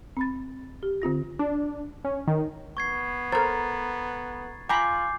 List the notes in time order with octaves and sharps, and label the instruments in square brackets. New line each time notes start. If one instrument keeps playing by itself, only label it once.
[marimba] C4 B5 A6
G4
D3 C4 F4 A#6
[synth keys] D4
C#4
D#3
[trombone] B3 [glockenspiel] C#6 G#6 C7
[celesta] A4 A#5 [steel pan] A#4 C5 [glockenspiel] A6
[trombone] F4 [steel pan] G5 A#5 B5 [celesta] G#5 [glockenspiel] D6 G6 C7